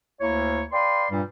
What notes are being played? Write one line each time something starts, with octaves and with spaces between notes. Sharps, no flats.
D2 A#3 E4 C#5
B4 D5 F5 G5 C6
G2 A#2 G3